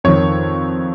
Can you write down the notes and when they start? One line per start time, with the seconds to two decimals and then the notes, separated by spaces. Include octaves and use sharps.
0.04 F2 D#3 C#5